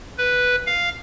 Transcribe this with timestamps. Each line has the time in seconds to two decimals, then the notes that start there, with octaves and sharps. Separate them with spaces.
0.18 B4
0.67 F5